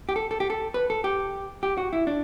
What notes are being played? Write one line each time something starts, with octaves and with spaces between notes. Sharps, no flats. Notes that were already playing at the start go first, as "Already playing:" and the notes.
G4
A4
A4
G4
A4
B4
A4
G4
G4
F#4
E4
D4